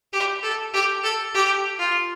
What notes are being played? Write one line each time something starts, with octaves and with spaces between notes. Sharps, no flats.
G4
A4
G4
A4
G4
F4